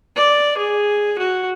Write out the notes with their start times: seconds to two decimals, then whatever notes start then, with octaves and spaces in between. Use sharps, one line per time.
0.16 D5
0.58 G#4
1.19 F#4